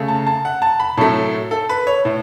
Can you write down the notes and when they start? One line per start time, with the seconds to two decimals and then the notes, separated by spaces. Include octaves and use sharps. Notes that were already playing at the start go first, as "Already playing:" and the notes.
Already playing: C#3 A3
0.08 A5
0.27 A5
0.45 F#5
0.62 A5
0.80 B5
0.97 A2 F#3 A3 A5
1.51 A4
1.69 B4
1.87 C#5
2.05 A2